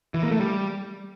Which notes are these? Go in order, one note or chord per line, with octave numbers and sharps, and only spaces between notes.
E3
A#3
A3
G3